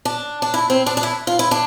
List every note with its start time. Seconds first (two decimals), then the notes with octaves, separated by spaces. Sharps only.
0.05 D4
0.42 D4
0.54 E4
0.70 C4
0.86 D4
0.97 D4
1.03 E4
1.27 F4
1.39 E4
1.51 D4